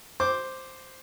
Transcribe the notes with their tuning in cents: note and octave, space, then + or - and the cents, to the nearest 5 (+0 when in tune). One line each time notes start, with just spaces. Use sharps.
C5 +0 D6 +0